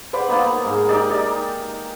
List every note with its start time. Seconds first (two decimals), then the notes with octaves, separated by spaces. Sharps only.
0.13 B4 C5 D5 F#5
0.29 A#3 B3 D#4
0.46 A#5
0.65 G#2
0.88 D#4 G4 D5 D#5
1.10 D#4 G4 D5